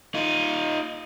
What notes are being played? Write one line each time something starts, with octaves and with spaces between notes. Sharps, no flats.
D#4 F4